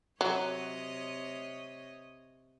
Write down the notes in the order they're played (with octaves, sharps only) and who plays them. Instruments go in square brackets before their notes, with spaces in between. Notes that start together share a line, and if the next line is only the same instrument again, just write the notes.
[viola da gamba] C3 C#5 D#5 [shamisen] F#3